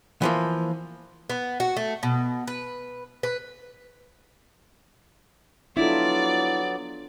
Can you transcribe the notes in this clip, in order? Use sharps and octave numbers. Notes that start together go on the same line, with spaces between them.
E3 F3 A#3
B3
F#4
A3
B2
B4
B4
F#3 B3 D4 E4 F4 A4 D5